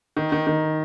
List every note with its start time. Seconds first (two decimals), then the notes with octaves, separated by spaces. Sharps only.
0.17 D#3
0.32 D#3
0.47 D#3